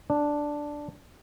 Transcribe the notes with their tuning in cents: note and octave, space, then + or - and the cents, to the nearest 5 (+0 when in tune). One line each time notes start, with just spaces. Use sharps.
D4 +0